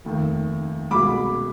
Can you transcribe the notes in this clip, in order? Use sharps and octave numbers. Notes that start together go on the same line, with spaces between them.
F1 D#2 D#3
C2 B2 G#3 B5 D6